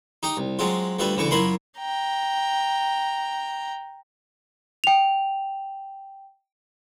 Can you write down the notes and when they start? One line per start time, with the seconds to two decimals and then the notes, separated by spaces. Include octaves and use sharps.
0.23 D#4 G4 D#5
0.37 C2
0.59 F#3 G#3 C4 F4
0.99 D2 G3 F4 B4 E5
1.17 D2 C#3 E3 C#6 D6
1.31 F#2 E4 F4 A#4 B5 C6
1.79 G5 A#5
4.84 G5 F7